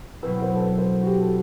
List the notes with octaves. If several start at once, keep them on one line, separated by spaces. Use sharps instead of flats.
B2 F#3 C4 E4 B4
C5
A4
B4
C5
F#4
G4
A4